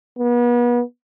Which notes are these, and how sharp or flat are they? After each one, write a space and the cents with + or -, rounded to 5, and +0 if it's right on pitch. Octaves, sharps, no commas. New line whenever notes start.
B3 -35